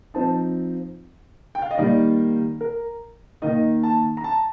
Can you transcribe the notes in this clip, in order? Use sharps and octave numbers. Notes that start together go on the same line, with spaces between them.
F3 C4 D#4 A5
G5
F5
D#5
D#3 G3 A#3 D#4 D5
A#4
D#3 A#3 D#4 D#5
A5
A#5
A5